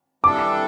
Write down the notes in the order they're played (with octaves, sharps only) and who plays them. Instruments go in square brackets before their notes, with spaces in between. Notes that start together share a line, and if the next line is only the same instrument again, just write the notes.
[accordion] E3 G3 D4 A4 [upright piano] D6